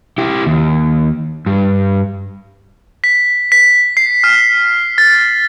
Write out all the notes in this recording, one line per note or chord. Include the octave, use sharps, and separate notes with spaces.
E4 G4
D#2
G2
B6
B6
C7
F6
A6